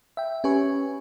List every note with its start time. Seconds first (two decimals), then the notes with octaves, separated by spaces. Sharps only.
0.17 E5 G5
0.44 C#4 G4 B4 G#5 C#6